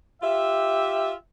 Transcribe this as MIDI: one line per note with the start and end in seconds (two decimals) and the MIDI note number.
0.22 1.13 65
0.22 1.13 67
0.22 1.13 76